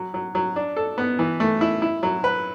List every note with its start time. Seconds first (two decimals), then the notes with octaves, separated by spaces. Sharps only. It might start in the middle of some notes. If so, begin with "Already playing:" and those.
Already playing: F#3
0.14 F#3
0.35 F#3
0.56 D4
0.77 A4
0.98 B3
1.19 E3
1.40 A3
1.61 E4
1.82 E4
2.03 F#3
2.24 B4